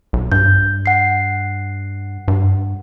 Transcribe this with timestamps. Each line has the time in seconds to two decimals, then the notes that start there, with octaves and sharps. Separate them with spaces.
0.13 B1
0.32 G2 G6
0.86 F#5 C7
2.28 G2